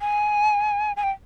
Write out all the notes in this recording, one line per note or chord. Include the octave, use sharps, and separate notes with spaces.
G#5
G#5
G5